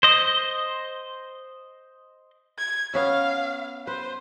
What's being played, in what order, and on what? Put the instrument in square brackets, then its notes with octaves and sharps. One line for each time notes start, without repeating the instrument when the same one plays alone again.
[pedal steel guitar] C5 D#5
[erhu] G#6
[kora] B3 C#4 E5 [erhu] F5
[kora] B4 [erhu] C5